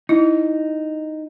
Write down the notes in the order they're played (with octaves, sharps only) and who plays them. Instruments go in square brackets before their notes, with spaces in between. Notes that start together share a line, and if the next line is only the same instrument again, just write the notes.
[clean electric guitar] D#4 [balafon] E4